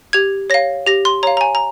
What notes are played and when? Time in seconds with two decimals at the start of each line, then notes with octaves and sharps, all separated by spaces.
0.13 G4 G#6
0.50 C#5 F5 A#6
0.87 G4 A#6
1.05 C6
1.23 C#5 F5 A#5
1.37 A#5
1.41 G#5
1.55 A#5